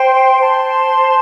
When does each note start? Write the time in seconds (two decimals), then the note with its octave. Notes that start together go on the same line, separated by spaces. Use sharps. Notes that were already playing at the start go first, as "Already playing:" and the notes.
Already playing: C5 G5 C6
0.39 C5 A5 C6